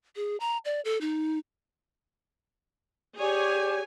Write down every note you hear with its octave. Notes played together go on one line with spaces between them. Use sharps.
G#4
A#5
D5
A4
D#4
G4 G#4 C#5 D5 G#5